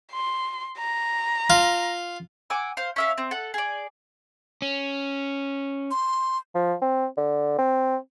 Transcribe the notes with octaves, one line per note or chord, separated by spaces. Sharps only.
C6
A#5
F4
F#5 G#5 D6 E6
C5 F5
C#4 E5 F5
C4
A4 F#5
G#4 D5
C#4
C6
F3
C4
D3
C4